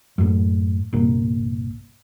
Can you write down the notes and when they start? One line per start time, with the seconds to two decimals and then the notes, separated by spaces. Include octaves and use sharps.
0.18 F#2 A2
0.93 G1 C2 A#2